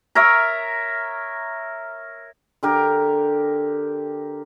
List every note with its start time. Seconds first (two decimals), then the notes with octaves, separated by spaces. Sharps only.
0.15 A#4 C#5 E5
2.63 D3 G4 A#4